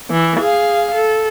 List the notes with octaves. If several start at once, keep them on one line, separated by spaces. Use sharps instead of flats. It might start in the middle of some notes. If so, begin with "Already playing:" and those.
E3
G#4 F5
A4